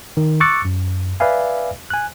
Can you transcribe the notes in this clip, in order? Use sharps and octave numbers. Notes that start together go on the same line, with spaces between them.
D#3
C#6 D6 E6 F#6 A6 C#7
F#2
B4 D5 E5 F5 G#5
G#5 F#6